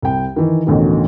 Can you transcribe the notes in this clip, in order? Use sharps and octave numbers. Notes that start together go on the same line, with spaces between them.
C2 G5
D#3 E3
A1 D2 B2 D#3